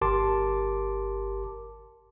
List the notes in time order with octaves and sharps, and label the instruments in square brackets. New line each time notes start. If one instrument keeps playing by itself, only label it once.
[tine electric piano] G1 G4 A#4 A5 C6 D6